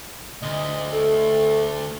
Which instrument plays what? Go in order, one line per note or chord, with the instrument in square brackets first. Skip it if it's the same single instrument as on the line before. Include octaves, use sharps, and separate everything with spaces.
[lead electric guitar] D2 [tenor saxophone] D#5
[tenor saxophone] A3